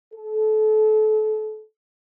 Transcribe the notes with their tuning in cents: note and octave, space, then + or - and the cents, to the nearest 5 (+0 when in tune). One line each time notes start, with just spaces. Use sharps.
A4 -30